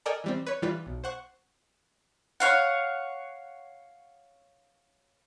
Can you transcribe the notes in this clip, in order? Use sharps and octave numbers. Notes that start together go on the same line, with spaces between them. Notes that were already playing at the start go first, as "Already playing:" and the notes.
A4 A#4 D5 D#5 G5 G#5
E3 G3 C4
B4 C#5
E3 G3 F4 B4
B1
C5 F#5 C#6
C#5 F5 F#5